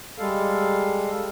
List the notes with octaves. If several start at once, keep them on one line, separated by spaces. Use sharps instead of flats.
G3 G#3 A4 F5